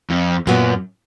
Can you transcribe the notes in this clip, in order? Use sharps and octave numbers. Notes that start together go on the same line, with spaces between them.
F2
F#2 A#2 F#3 B3